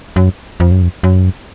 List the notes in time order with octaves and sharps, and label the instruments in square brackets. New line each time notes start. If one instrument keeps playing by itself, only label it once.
[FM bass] F#2
F2
F#2
F2
F#2